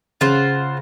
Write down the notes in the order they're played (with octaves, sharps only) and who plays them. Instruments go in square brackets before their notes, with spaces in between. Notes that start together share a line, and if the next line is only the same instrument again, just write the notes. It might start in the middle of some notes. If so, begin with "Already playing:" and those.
[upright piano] C#3 [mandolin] F4 C5 F#5